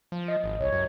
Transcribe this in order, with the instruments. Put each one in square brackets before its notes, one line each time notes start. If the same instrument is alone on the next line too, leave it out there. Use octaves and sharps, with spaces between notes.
[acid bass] F3
[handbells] D#5
[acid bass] G#1
[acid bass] C2 [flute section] C#5
[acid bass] F#2